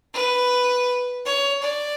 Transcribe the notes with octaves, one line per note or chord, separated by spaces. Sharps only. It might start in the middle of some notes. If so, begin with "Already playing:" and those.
B4
C#5
D5